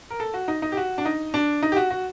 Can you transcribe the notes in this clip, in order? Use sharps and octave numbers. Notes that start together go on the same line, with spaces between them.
A#4
A4
F#4
D#4
D#4
G4
F#4
D4
D#4
D4
D#4
G4
F#4
F#4